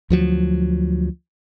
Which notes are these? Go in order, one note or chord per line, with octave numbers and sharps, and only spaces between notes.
D2 F3 F#3